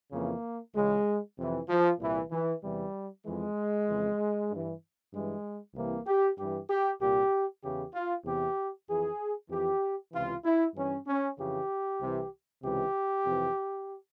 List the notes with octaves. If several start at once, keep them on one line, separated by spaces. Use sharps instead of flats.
F2 C#3 E3 A#3
C#2 C#3 E3 G#3
F2 C3 E3
F3
C2 A#2 E3
E3
E2 C3 E3 G3
F2 E3 G#3
F2 C#3 E3
G2 E3
G2 E3 G#3
C2 C3 E3 A#3
G4
G2 E3 G4
G4
C2 A#2 G4
E2 C#3 E3 G4
F4
E2 C3 E3 G4
F2 E3 G#4
F2 E3 G4
C#2 C3 E3 F4
E4
G2 E3 C#4
C#4
F2 C#3 E3 G4
C2 C3 E3
C#2 C3 E3 G4
F2 C3 E3